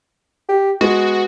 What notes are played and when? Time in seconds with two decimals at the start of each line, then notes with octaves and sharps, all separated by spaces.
0.49 G4
0.81 G#3 B3 F#4